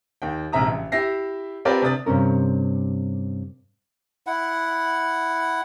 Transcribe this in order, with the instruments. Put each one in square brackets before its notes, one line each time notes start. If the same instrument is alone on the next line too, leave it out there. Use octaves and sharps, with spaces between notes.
[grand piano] D#2 G5
A#1 G#2 C3 E5 A#5 D#6
A1
E4 G4 E5 A#6 C7
C4 F4 G4 A#4 B4 D5
C3 D4 D#6 A6
[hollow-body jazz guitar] G2 C3 C#4 A#4
[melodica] E4 F#5